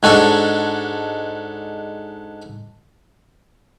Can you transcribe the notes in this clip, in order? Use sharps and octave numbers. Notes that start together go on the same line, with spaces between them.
G#2 G#3 D4 F#4 A4